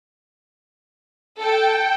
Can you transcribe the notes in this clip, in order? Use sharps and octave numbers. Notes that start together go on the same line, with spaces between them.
A4 G5